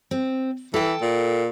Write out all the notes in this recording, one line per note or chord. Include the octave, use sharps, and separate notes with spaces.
C4
E3 A4 G5
A#2